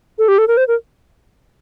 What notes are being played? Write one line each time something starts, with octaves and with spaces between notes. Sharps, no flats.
A4
G4
A4
A#4
C5
A#4